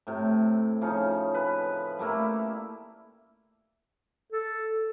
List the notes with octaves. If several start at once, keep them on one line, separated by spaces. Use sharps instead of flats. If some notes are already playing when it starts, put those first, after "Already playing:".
A2 C3
C#3 F3 C#4 D#4
B4
G3 A3 A#3 E4
A4